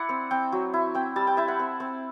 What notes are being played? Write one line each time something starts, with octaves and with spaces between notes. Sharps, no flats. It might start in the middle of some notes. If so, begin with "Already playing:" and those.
Already playing: E4 D5 F#5
C4
C4 G5
F#3
E4
C4 G5
G3 A5
G5
E4 E5
F#5
C4
C4